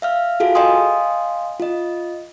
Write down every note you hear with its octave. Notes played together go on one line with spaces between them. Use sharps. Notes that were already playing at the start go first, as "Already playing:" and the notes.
E5 F5 F6
F4 F#4 G#4 A4 F5
D#5 F5 G5 G#5 C6 D#6
F4 D#5